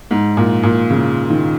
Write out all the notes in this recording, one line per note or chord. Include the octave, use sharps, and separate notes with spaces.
G#2
A#2
A#2
C#3
D#3